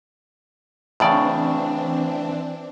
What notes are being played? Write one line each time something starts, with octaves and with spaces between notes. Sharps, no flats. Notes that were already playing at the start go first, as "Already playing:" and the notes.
A2 C#3 E3 C4 D4 D5